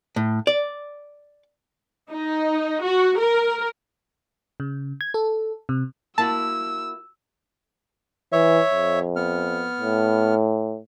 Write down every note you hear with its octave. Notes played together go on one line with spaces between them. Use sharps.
A2
D5
D#4
F#4
A#4
C#3
G#6
A4
C3
A#3 E4 F#4 A5 E6
E3 C#5 E5
F2
B3 F6
A2